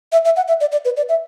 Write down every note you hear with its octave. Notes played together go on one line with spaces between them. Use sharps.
E5
E5
F#5
E5
D5
D5
B4
D5
E5